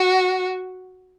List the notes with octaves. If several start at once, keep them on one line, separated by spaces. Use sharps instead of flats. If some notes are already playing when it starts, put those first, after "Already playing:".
Already playing: F#4